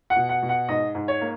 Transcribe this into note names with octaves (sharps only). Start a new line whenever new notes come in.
F#5
B2
F#5
B2
F#5
G#2 D#5
G#2
C#5
A#3